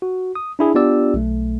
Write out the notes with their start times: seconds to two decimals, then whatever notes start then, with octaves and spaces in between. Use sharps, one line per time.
0.02 F#4
0.35 D#6
0.59 D4 E4 G#4
0.75 B3 D4 F4 G4 D5 E6
1.14 B1 A3